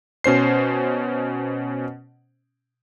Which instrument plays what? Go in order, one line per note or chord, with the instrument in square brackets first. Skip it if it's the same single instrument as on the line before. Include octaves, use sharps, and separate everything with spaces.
[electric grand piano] B2 C#4 C5 C7